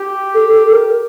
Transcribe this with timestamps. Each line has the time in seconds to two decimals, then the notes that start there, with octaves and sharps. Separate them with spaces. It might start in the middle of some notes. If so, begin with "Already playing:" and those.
Already playing: G4
0.34 A4
0.53 A4
0.71 A#4